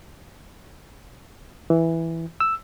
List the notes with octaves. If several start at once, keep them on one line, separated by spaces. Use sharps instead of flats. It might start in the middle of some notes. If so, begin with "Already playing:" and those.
E3
E6